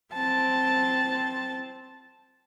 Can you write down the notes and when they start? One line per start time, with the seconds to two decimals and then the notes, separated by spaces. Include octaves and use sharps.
0.14 C4 A5